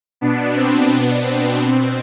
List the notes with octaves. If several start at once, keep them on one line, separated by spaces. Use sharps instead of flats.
B2 B3 D4
C4
B2 B3 D4
C4
B2